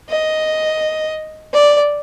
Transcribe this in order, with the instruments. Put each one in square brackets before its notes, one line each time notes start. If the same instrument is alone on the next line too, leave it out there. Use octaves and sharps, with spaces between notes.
[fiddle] D#5
D5